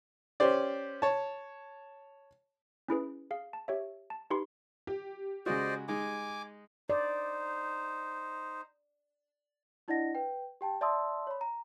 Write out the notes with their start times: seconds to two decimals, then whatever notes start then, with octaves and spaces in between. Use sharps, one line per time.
0.40 C#4 G4 C5 D5
1.02 C#5 A5
2.89 C#4 E4 G#4 B4
3.31 G#4 F5
3.53 A5
3.68 G4 C#5 E5
4.10 A5
4.30 D#4 G4 B4 B5 C6
4.87 G4
5.46 C#3 G#3 F#4 C5 D5 D#5
5.88 G#3 D#4 G#5 D6
6.90 D#4 C5 D5
9.88 D4 E4 D5 D#5 F#5 A#6
10.15 B4 G5
10.61 G4 G5 A5
10.81 D5 E5 A5 C6 D#6 E6
11.27 C#5 B5
11.41 A#5